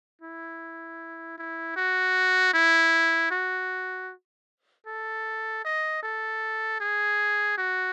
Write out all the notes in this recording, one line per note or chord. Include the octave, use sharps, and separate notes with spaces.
E4
E4
F#4
E4
F#4
A4
D#5
A4
G#4
F#4